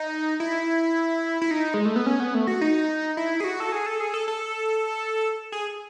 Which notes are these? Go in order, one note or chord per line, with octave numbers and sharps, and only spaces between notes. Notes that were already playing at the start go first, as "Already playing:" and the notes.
Already playing: D#4
E4
E4
D#4
G#3
A3
B3
C#4
B3
A3
F#4
D#4
E4
G#4
F#4
A4
G#4
A4
G#4
A4
A4
G#4